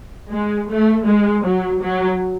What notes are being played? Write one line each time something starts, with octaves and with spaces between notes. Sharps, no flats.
G#3
A3
G#3
F#3
F#3